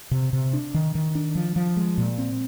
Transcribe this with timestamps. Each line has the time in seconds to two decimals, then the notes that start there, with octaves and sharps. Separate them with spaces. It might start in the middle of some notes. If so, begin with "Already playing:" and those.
0.11 C3
0.33 C3
0.53 D4
0.74 D#3
0.95 D#3
1.15 D4
1.35 F3
1.56 F3
1.77 G#3
1.98 A#2
2.18 C4